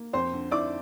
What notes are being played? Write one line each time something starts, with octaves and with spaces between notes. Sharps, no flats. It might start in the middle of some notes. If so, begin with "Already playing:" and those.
Already playing: A#3
F2 C5 C6
D3
E4 D5 D6